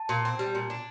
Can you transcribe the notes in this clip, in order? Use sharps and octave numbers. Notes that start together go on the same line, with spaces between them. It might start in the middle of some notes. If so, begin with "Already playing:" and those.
Already playing: A5
A#2
C4
G3
A#2
D4